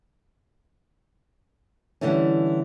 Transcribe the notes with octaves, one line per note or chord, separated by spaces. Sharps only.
D3 E3 G3 A3 C#4